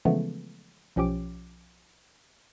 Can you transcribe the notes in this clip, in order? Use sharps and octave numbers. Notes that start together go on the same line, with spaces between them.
C#3 E3 F3 G#3 A3 B3
B1 F3 C#4 G4 D6